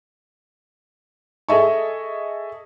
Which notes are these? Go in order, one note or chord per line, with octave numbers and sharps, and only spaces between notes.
G#4 A4 D#5 E5 C#6